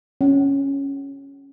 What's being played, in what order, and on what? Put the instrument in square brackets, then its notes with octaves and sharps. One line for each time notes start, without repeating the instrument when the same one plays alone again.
[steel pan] C#4